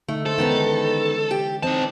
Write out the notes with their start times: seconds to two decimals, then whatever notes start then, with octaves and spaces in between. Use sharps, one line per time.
0.08 D3 A3 D#4 A4
0.26 A4 C5
0.38 D#3 E3 G#3 B3 C#4 D#4
1.31 G4
1.63 E3 C4 D#4 D#5 A5